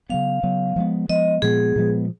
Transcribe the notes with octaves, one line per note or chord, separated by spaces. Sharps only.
C#3 F#3 B3 F5
C#3 F#3 B3
F3 G#3 B3
F3 G#3 B3 D#5
A#2 F3 G#3 B3 G#4
A#2 F3 G#3 B3